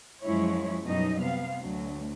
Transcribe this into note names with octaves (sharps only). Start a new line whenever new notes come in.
F#2 F3 G#3 E4 C#5
F#2 B2 G3 D#4 D#5
C3 B3 F5
D2 F#3